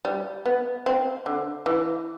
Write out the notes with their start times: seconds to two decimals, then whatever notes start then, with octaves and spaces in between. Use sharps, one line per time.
0.05 G3
0.46 B3
0.86 C4
1.26 D3
1.66 E3